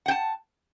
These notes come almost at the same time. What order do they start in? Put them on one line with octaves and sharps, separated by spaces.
F#5 G5 A5